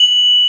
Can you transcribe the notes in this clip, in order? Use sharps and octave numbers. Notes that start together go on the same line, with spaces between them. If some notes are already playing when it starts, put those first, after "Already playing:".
Already playing: F#7